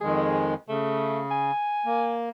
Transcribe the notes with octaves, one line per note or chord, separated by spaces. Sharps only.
F2 D#3 G#3 G#4
C#3 A3
G#5
A#3